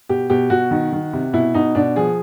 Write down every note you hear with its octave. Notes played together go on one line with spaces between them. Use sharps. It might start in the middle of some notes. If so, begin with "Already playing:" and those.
B2 G4
B2 G4
B2 F#4
D#3
D#3
C3
B2 E4
B2 D#4
B2 D4
F3 G#4